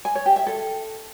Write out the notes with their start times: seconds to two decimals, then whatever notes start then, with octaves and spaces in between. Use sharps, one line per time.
0.05 G#5
0.15 C#5
0.26 G4
0.36 E5
0.47 A4